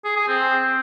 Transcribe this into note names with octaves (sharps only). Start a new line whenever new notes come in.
G#4
G#4
C4